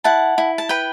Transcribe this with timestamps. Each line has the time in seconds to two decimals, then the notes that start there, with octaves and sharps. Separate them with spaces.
0.04 E4 F#5 A5
0.38 E4
0.58 A5
0.69 B4 G5 B5